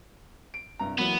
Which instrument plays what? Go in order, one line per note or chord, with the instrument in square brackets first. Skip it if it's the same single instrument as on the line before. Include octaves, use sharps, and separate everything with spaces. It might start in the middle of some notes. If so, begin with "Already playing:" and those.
[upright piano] D7
C2 G2 A#5
[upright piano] E3 F#3 A#3 [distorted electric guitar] B3